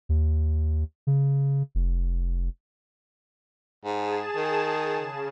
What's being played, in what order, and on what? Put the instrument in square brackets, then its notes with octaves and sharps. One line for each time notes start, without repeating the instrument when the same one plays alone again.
[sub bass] D#2
C#3
F1
[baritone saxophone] G#2 [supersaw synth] G#4 A5 E7
[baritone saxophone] D#3
[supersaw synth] C#3